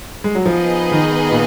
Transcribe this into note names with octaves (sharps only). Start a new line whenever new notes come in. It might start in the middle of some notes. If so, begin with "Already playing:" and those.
G#3
F#3
F3 B3 D#4 G#4 B4 D#5
D#3
A#2